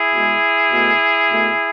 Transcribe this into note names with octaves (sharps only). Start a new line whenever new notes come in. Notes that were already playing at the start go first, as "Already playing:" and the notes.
Already playing: E4 G#4
B2 G#3
B2 A3
B2 A3